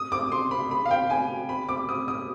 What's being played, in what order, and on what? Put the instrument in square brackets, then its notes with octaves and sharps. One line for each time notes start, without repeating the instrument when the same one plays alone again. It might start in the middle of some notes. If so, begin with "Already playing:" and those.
Already playing: [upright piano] D#6
D6
C6
B5
B5
F5
G5
G#5
B5
D6
D#6
D#6